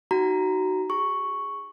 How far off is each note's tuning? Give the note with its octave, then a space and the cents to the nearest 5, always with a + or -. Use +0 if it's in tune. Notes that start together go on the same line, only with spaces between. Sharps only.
D#4 +0 F#4 +20 A#5 +0
G#4 -20 C#6 +0